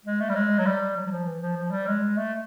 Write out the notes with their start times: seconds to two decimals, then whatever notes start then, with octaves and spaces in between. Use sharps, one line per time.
0.05 G#3
0.20 A3
0.29 G3
0.35 G#3
0.59 F#3
0.66 G3
0.96 F#3
1.07 F#3
1.11 F3
1.26 E3
1.41 F3
1.56 F3
1.71 G3
1.87 G#3
2.17 A3